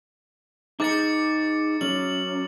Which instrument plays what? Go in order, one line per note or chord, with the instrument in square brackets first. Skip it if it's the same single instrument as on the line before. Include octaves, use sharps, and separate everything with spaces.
[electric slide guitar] D#4 G#4 [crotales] D6 A6 C#7
[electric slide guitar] F#3 C#4 [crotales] F#7